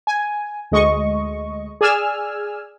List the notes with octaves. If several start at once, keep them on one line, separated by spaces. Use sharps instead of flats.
G#5
D2 G#3 D#5 C#6
G#4 D5 G#5 E6 F6